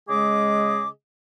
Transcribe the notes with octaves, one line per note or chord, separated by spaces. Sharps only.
C#3 G#3 G#4 D#5 D6